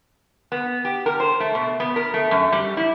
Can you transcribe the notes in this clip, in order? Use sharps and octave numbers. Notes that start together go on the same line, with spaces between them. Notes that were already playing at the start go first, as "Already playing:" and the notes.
B3
G4
A#4
C5
A3
B2
B3
A#4
A3
F#2
G3
E4